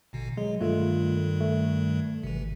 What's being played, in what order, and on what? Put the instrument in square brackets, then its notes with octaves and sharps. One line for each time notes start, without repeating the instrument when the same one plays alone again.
[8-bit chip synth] A1 B2 D3
[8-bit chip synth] F#3 [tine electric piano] G#3
[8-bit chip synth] G2 D#3 G3 [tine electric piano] A3 F4 A4
[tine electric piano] A3
[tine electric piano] G#1 [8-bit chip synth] C3 E3